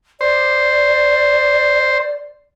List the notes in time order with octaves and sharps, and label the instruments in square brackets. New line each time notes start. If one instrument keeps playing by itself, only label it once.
[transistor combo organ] C5 [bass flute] D5